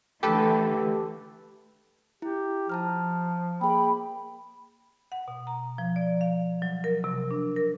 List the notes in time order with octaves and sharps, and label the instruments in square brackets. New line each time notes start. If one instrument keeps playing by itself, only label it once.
[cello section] D3 E3 A3 [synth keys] G4 A4 B4
[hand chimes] E4 [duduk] G4
[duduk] F3 [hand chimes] A5 A#5 F6
[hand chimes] A#3 G#4 [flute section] G5 B5
[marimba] F#5
B2
A#5
F3
D5
F5
F#3
A#4
C3
D4
A#4